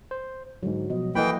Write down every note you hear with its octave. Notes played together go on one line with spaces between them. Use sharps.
C5
G#2 D3 F#3 G#3
B2 F3 D#5
E3 A#3 E4 A4 D#5 F#5 G5 B5